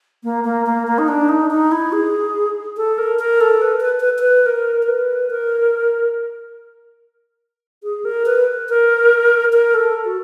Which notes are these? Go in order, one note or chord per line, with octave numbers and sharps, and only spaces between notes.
A#3
A#3
A#3
A#3
D#4
D4
D#4
D#4
E4
G#4
A4
A#4
A#4
A4
B4
B4
B4
B4
A#4
A#4
B4
A#4
G#4
A#4
B4
A#4
A#4
A4
F#4